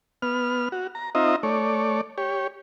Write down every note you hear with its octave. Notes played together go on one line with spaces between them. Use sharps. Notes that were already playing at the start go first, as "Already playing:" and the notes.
B3 F6
F#4
A#5
C4 D#4 F4 D#5 E5 A#5
A3 C#5 D5
G4 C#5